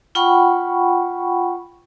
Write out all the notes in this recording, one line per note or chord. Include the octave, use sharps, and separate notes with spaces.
F4 F#5 G5 B5 C#6